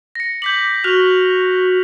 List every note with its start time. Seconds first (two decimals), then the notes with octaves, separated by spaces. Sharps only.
0.15 A#6 C#7
0.42 D6 G6 B6 F#7
0.84 F#4 F6 F#6 F7